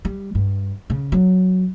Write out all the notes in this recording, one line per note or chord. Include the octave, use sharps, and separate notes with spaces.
G3
G2
C#3
F#3